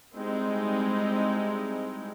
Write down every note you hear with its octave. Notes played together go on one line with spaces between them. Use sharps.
G3 G#3 C4 D#4 E4